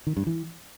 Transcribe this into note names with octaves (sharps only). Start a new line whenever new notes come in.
D#3
G2
E3